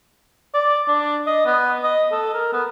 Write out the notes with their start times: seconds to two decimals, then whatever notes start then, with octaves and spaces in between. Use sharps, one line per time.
0.54 D5
0.88 D4
1.27 D#5
1.46 B3
1.84 D#5
2.12 A4
2.34 A#4
2.53 B3